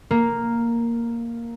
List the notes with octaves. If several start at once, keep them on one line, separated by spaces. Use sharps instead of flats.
A#3